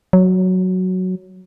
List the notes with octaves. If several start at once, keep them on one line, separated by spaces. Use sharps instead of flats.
F#3